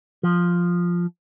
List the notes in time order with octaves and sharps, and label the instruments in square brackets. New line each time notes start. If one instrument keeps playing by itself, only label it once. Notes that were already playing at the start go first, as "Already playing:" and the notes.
[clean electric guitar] F3